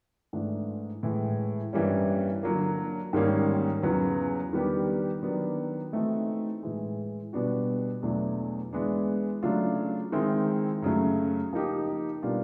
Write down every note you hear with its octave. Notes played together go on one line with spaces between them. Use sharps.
G#2 E3 A3 D4
A2 E3 G#3
G2 E3 G3 A#3 C#4
D3 F#3 A#3
G#2 D#3 G3 A#3 C#4
E2 C#3 F#3 B3
D#3 G3 B3 D4 G4
D#3 F#3 B3 D4
E3 A3 C4 D#4 F#4
A2 E3 G#3
B2 G3 B3 D4 F#4
E2 B2 F#3 A3 D4
E3 G#3 B3 D4
C#3 F#3 A3 D4 F4
D#3 G#3 C4 E4
F#2 C#3 F#3 A3
F3 A#3 D#4 G4
B2 G3 A#3 D4 F4